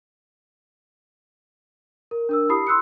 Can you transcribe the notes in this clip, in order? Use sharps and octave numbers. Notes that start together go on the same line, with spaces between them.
A#4
D4 A#4 E6
E4 G4 B5 D#6 C7
C6 E6 F#6 C#7